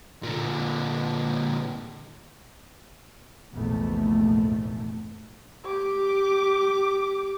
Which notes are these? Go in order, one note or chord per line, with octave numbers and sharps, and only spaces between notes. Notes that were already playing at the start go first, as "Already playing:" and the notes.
A#2 D3
F1 A#1 E2 G#2 A3
G4 D6